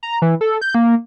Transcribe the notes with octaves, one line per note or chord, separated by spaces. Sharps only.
A#5
E3
A4
G6
A#3